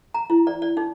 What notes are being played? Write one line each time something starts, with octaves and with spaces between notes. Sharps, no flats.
A#5
E4
D5
D5
D#4